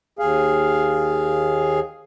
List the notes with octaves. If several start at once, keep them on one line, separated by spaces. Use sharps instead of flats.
D#2 G#4 F5